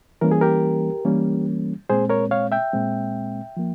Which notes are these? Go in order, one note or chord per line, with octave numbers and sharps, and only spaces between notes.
E3 G3 A#3 C#4 A#4
G#4
G4 A#4
E3 G3 A#3 C#4
A#2 G#3 C4 G#4 C5
A#4 C#5
C#5 F5
E5 G5
A#2 G#3 C4
F3 A#3